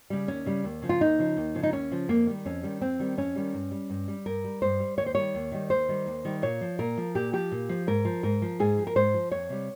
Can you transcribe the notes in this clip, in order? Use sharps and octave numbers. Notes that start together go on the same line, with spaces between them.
C#3 G3
D#2 C#4
C#3 G3
D#2
C#3 F3
F4
D#2 D#4
C#3 F3
D#2
C#3 F3
D#4
D#2 C#4
C#3 F3
F2 A#3
D#3 G3
F2 C#4
D#3 G3
F2 C4
D#3 G3
F2 C#4
D#3 G3
G2
G3
G2
G3
G2 A#4
G3
G2 C5
G3
D#2 C#5
C5
D#3 G3 C#5
D#2
D#3 G3
D#2 C5
D#3 G3
D#2
D#3 G3
A#2 C#5
F3
A#2 A#4
F3
A#2 G4
F3 G4
A#2
F3
G#2 A#4
F3
G#2 A#4
F3
G#2 G#4
F3
A#4
G#2 C5
F3
F2 C#5
C3 G3